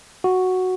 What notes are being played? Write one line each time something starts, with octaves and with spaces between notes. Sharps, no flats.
F#4